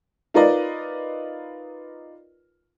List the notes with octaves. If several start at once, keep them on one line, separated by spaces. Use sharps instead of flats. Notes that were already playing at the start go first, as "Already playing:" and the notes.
D#4 F4 A#4 B4 D5 D#5